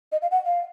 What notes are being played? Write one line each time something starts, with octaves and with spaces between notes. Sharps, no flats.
D#5
F5
F#5
F5